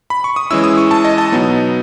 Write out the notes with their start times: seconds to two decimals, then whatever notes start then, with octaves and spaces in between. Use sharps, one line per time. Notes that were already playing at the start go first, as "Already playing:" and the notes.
0.10 B5
0.24 C#6
0.36 D#6
0.51 E3 G#3 C#4 E4 E6
0.64 D#6
0.78 C#6
0.91 A5
1.05 D#5
1.18 A5
1.32 B2 F#3 B3 D#4